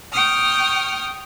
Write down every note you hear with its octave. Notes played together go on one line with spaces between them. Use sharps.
G5 C#6 D#6 F6